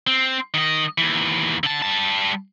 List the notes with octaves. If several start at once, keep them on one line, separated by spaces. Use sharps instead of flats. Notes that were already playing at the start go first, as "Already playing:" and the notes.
C4
D#3 D#5
D#2 E3
D3 A5
G3 A5